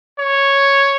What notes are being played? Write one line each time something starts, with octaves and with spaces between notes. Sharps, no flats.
C#5